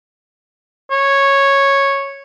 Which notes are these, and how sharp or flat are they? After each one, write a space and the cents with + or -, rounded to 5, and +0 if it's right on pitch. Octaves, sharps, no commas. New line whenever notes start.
C#5 -5